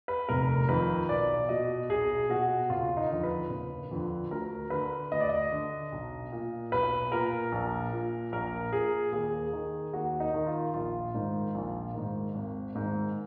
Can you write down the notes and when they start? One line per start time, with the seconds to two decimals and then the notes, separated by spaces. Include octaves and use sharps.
0.08 B4
0.29 F1 A#4
0.69 F2 D#3 B4
1.09 B1 D5
1.49 B2 D#5
1.89 B1 G#4
2.30 B2 F#4
2.69 F#1 F4
2.97 D#4
3.10 F2 D3
3.23 B4
3.50 F#1
3.91 F2 D3
4.31 D2 A#4
4.70 D3 B4
5.12 D2 D#5
5.20 D5
5.29 D#5
5.52 D3
5.92 B1
6.32 A#2
6.72 B1 B4
7.12 A#2 A#4
7.52 A#1
7.93 A#2
8.32 A#1 A#4
8.73 A#2 G#4
9.13 D#2 G#4
9.53 D#3
9.93 D#2 F#4
10.20 D#4
10.34 D#3
10.47 F4
10.74 A#1 F4
11.14 G#2 D#3
11.55 A#1
11.94 G#2 D#3
12.35 G#1
12.75 G#2 D#3